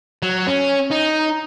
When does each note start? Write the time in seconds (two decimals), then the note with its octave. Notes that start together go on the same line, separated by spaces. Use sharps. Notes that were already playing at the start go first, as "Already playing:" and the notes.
0.22 F#3
0.47 C#4
0.91 D#4